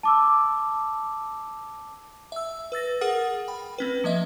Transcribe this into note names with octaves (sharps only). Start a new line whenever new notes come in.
A5 D6 E6
E5 E6
B4 E6 A6 A#6
G#4 A#4 F#5 D#6 F6
G5 B5
C4 C#4 B4
F3 A#3 D#5 E5